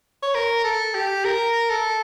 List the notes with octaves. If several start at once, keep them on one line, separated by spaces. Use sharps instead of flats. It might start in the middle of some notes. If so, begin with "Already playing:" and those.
C#5
A#4
A4
G4
A#4
A4